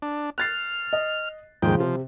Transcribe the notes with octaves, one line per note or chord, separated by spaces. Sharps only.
D4
F6 F#6 A6 C7
D#5
D#2 G#2 C#3 F3 G5
C3 F3